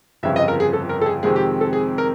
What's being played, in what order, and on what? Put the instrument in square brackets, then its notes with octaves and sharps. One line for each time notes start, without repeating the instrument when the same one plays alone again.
[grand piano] G1 F2 C#3 E5
D#5
A#4
G#4
A4
A#4
A4
G#4
F2 C3 D#3 G#3 C4 G#4
G4
A4
G#4
A#4